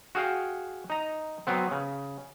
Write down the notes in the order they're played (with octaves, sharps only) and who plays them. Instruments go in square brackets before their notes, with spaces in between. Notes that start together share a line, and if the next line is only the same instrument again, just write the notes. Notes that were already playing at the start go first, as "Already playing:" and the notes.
[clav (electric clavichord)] F#4 G#4 F5 G5
D#4 A#5
F#3 B3 C4
C#3